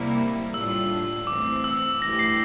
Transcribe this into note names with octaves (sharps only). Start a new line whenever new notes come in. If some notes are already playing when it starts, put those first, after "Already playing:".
Already playing: C3 G3 A#3 E4
A2 G3 D4 F4 E6
E3 A3 C4 D6
E6
G2 E3 A3 E4 G4 A#6
C7